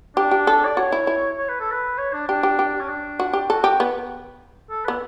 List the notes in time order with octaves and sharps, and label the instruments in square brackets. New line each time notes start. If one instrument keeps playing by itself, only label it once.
[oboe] D4 [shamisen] G4
[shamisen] G4
A4
[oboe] D5
[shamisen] F#4 [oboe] C#5
[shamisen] E4
E4
[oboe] C#5
B4
A4
B4
C#5
D4
[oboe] D4 [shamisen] G4
[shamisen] G4
G4
[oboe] C#4
D4
[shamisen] F#4
G4
[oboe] F#4 [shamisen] A4
[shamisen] G4
B3
[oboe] A4
[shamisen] B3 [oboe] B4